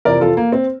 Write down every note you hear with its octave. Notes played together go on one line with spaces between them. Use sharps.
F2 C3 E3 A#4 D5
F4 A4
A#3
C4